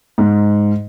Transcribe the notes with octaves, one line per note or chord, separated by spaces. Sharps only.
G#2